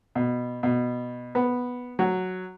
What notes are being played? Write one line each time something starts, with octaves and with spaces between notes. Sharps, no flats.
B2
B2
B3
F#3